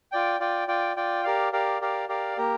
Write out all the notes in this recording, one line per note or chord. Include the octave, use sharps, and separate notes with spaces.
F4 D5 G5
F4 D5 G5
F4 D5 G5
F4 D5 G5
G4 A#4 D5 F5
G4 A#4 D5 F5
G4 A#4 D5 F5
G4 A#4 D5 F5
A#3 G4 A#4